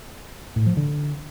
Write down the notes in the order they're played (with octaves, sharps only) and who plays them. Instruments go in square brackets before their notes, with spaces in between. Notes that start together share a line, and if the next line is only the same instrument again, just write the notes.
[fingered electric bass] A2
F3
D3